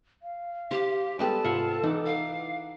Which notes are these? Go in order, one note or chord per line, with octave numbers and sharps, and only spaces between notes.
F5
G4 C5
G3 G#3 B3 G4 A4 B4 D5 A5
G#2 C3 F4 F#5 G#5
E3 D#4 F#5 D6
F5